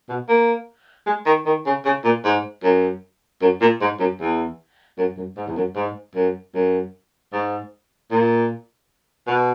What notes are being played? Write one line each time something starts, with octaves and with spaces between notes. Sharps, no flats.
B2
A#3
G#3
D#3
D#3
C#3
C#3
A#2
G#2
F#2
F#2
A#2
G#2
F#2
E2
F#2
F#2
G#2
E2
F#2
G#2
F#2
F#2
G#2
A#2
B2